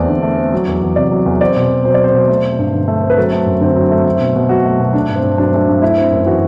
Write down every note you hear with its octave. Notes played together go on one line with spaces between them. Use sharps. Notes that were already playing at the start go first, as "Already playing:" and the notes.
Already playing: E2 A3 C4 D5
D3
A3
C4
F#3
E2
E2
C3 D5
F#3
E2
C4 D5
B2
B2
F#3 C5
D5
C4 C5
B2
A3
C4
G2
D3
A3
C4
B4
F#3 A4
A3
F#2
D3 C4
F#3
A3
A3
B2
B2
F#3 F#4
A3
B2
A3 D4
G2
C4
G2
F#3 D4
C4
A3 D4
G2
A3 E4
C4
F#2
E3 F#4